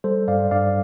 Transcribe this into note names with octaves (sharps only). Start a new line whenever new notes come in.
G3 A4 C5
G2 D5 F5
G2 D5 F5